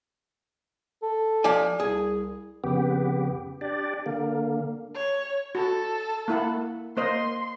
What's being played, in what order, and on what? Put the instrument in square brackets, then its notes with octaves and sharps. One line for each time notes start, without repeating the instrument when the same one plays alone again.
[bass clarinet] A4
[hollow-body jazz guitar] F3 D5 G#5
[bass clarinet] C2 [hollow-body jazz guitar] G#4
[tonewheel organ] F2 C#3 B3 G4
D4 G4 D5
D3 A#3
[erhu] C#5
[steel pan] F#4 [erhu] A4
[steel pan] A#3 E4 F#5
[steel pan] A#3 C5 D#5 [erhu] C6